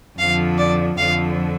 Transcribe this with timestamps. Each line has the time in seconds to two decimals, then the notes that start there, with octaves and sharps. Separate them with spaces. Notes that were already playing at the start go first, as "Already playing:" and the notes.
0.18 F2 D3 F3 F5
0.58 D5
0.98 F2 D3 F3 F5